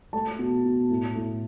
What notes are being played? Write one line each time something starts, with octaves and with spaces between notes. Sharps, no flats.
A3 A5
B2
B2
A2
A2